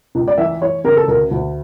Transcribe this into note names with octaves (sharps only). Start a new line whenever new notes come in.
C#2
D5
E3 E5
E3 C#5
C#3 A#4
A4
D2 A#4
D2